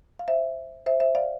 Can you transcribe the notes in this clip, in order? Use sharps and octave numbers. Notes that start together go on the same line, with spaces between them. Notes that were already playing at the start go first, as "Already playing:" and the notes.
F5
C5 E5
C5 E5
C5 E5
D5 F5